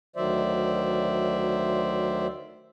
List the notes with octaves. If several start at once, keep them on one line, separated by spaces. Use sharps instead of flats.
D2 D#3 F#3 C5 D5 E5